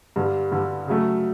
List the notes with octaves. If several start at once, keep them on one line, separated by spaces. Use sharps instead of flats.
G2 D3 G3
G2 D3 G3
C#3 F#3 A3